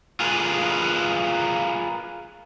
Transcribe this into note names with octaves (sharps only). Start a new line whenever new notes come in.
F4 G#4 A#4 B4